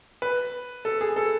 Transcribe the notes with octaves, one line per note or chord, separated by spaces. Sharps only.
B4
A4
G#4
A4